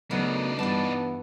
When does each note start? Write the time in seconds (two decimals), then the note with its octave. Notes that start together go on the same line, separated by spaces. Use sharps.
0.11 C#3 F#3 A3 B3 D4 D#4 A#4
0.59 G2 E3 B3 A5